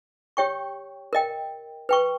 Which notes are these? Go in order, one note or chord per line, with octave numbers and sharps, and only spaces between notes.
G4 C#5 G5 C#6
A#4 D#5 G5
B4 G5 C#6